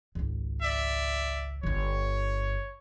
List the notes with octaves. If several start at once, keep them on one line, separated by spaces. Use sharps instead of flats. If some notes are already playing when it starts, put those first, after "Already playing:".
G#1 C#2
D5 E5
G1 D3 C#5